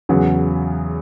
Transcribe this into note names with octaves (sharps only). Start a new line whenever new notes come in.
E2 C#3 F#3 B3